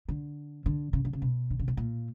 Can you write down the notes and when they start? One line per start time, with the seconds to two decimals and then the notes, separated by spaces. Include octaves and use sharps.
0.09 D3
0.66 D3
0.93 C#3
1.05 D3
1.13 C#3
1.22 B2
1.50 D3
1.59 C#3
1.68 B2
1.77 A#2